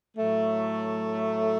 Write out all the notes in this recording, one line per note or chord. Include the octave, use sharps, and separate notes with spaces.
A2 F#3 A3